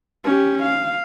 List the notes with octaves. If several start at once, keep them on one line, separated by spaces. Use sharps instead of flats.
C#4 G4
F5